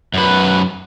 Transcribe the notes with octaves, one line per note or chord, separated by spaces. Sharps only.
F#2 B4